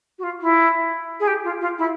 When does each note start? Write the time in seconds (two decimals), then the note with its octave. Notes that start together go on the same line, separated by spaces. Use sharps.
0.19 F#4
0.23 F4
0.41 E4
1.20 G#4
1.27 G4
1.44 F4
1.61 F4
1.78 E4